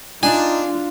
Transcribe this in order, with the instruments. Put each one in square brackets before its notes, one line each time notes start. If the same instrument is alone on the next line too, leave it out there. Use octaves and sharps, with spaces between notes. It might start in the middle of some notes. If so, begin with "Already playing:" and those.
[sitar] D4 [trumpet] D#4 [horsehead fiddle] F4 [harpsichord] G#5